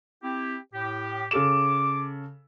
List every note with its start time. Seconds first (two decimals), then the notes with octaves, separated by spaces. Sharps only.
0.23 C4 E4 G4
0.74 A2 G4
1.31 C#3 A4 D6 E7